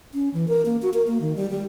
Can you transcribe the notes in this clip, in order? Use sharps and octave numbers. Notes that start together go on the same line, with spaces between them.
C#4
E3
A#4
A#3
F#4
A#4
A#3
D#3
G3
G3